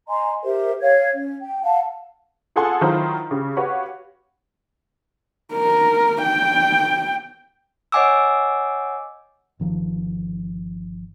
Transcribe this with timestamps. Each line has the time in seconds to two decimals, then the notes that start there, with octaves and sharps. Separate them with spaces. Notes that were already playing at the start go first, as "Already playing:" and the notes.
0.08 D#5 G#5 A#5 C6
0.44 G4 A#4 C5 E5
0.81 C#5 F5 G#6
1.13 C#4
1.40 G5
1.63 F5 F#5 A5
2.56 F4 G#4 A4 F#5 G#5 C6
2.81 D#3 F#3 E4 F4 C5
3.31 C#3 G4
3.57 F#4 G4 B4 C#5 F5
5.53 A#4
6.22 G5
7.92 C#5 D#5 F#5 G#5 D6 E6
9.60 G1 D#3 F3